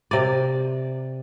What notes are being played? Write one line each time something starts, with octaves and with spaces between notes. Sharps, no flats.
C3 D5